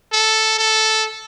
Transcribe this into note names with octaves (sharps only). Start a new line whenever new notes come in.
A4
A4